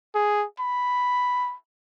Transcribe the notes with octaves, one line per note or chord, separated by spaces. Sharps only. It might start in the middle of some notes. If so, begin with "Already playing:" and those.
G#4
B5